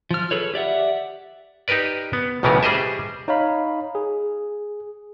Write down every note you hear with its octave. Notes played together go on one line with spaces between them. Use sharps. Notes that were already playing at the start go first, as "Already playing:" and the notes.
F3 F6
G#4 A4 B4 C#5
G4 D5 E5 F#5
D#4 G4 A#4 B4 D5
B3
B1 A2 C#3 E3 B3 A#4
G3 G#4 C5 D#5 E5
D#4 C#5 F5 B5
G#4